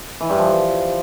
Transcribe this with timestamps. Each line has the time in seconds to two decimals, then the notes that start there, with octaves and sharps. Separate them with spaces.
0.21 E3
0.30 G2
0.39 F3